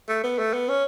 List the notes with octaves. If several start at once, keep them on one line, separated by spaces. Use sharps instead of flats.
A3
B3
A3
B3
C#4